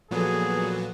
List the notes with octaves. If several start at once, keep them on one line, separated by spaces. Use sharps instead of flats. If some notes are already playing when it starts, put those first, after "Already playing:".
A#2 F3 F#3 B3 G#4 A4